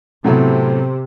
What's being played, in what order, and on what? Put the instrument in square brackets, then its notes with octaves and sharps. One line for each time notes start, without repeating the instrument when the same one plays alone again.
[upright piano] A2 F#3 B3 E4 A4 [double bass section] C3